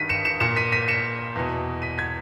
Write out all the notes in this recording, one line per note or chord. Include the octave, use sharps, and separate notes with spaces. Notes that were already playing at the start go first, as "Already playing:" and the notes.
Already playing: G2 D#3 B6 D#7
C#7 E7
C#7 E7
A#2 C#7 E7
B6 D#7
B6 D#7
C#7 E7
E2 B2
B6 D#7
G#6 B6